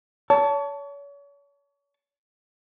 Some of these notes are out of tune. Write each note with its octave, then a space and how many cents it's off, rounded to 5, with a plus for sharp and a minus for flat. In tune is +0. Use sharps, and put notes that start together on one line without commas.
C#5 +35 A5 +0